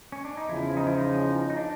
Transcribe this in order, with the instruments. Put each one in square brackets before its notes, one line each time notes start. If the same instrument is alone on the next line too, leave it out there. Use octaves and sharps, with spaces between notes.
[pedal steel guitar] C#4
D4
D#4
[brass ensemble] E2 C#3 F3 [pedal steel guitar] E4
[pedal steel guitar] D#4
E4
D#4
D#4
D4